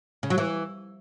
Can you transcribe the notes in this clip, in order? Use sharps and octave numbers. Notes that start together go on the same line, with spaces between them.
C#3
F#3
E3